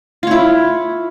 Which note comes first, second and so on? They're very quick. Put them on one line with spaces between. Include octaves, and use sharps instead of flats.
F4 C#5 E4